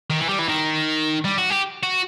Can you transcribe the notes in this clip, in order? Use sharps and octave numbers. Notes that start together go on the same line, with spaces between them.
D#3
E3
G3
E3
D#3
G3
F#4
G4
F#4